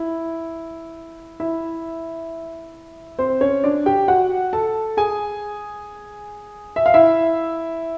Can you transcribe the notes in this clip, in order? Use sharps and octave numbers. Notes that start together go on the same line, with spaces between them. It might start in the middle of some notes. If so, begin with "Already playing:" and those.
Already playing: E4
E4 E5
C4 C5
C#4 C#5
D4 D5
G4 G5
F#4 F#5
A4 A5
G#4 G#5
E5
F5
E4 E5